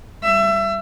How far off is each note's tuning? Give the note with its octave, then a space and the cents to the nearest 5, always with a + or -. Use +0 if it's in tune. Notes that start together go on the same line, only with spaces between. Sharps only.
G3 +0 E5 +25